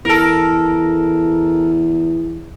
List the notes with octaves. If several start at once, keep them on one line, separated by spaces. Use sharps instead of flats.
E2 A4 A#4